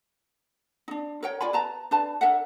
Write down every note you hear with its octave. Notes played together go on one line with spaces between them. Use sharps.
D4 D#4
A#4 C#5 G5
F4 D5 G#5 B5
B4 A5 A#5
D4 B4 A5
D4 A#4 E5 F#5